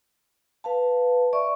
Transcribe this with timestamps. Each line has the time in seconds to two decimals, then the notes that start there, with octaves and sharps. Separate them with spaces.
0.64 B4 F5 A5
1.33 D5 E5 C#6